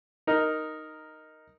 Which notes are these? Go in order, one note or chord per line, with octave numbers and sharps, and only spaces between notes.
D#4 A#4